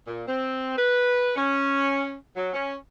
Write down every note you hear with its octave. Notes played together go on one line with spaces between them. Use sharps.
A#2
C4
B4
C#4
F#3
C#4